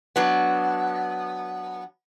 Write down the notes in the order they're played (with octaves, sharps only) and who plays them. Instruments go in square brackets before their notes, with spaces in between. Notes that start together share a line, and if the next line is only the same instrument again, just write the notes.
[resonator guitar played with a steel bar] F#3 B3 D4